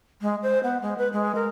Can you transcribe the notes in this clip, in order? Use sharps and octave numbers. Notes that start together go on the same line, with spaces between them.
G#3
C5
B3
G#3
B4
G#3
A#4